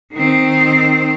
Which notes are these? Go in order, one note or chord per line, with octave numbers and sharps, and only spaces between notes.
D#3 C4